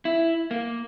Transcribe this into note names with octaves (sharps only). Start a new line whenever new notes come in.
E4
A#3